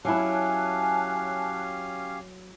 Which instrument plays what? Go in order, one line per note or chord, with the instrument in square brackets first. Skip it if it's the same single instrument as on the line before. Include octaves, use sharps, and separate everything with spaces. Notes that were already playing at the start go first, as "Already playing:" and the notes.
[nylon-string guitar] F#3 E4 [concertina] C#4 G4 F5 [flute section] G#5 A5 F#6